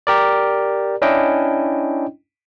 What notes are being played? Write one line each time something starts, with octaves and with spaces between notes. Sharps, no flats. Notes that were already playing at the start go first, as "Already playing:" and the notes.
G4 A#4 D5
C#4 D4 E4 D#5 G5